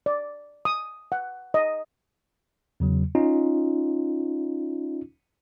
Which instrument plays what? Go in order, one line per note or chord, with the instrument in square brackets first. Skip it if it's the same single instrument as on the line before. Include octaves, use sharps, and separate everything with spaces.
[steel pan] D5
D#6
F#5
D#5
[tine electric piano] E2 C#3 F#3
C#4 D#4 F4